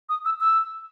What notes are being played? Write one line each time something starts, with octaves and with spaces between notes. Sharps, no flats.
D#6
E6
E6